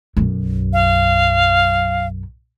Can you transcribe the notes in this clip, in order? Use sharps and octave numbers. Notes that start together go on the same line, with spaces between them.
B1 F#2
F5